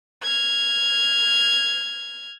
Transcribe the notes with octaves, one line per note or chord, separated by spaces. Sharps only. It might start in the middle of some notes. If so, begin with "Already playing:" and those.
F6 G#6